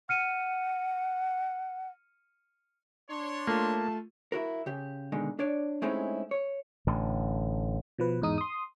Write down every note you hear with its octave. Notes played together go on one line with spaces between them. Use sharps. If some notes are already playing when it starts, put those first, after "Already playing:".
F#5 F6 C#7 D#7
D4 C#5 C6
A3 A#3 F4 A5
E4 F#4 A#4
C#3 G4
B2 D3 D#3 G#3
D4 C#5 D5
G#3 A3 C4 C#4 D#4 E4
C#5
A1 A2 D3
B2 F3 B4
E2 G#2 D#4 D#6
C6 D#6